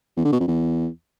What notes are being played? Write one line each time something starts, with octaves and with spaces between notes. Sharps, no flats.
E2
D3
B2
F2
E2